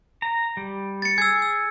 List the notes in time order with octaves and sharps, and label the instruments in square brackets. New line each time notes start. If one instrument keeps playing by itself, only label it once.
[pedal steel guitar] A#5
G3
[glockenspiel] A6 C#7
[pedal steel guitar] G#4 [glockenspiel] E6 G#6
[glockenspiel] E6